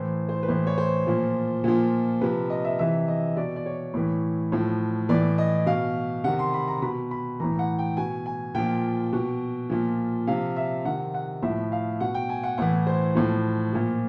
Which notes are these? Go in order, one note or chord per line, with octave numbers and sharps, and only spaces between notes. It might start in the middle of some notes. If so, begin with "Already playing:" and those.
Already playing: A2 E3 C5
C5
B4
A2 E3 C5
C#5
C5
A#2 F3
A#2 F3
C3 F3 B4
D#5
E5
C3 E3 E5
D#5
B2 D5
D5
C#5
A2 E3
A2 F3
A2 E3 D5
D#5
B2 F5
C3 D#3 F#5
C6
B5
A#5
B2 B5
B5
A2 E3 A#5
F#5
G5
B2 G#5
G#5
A#2 F3 G5
B2
A#2 F3
C3 F3 F5
E5
C3 D#3 F#5
F#5
A2 F3 E5
F5
B2 F#5
G5
G#5
F#5
A2 E3 F#5
C5
A2 F3
A#2 F3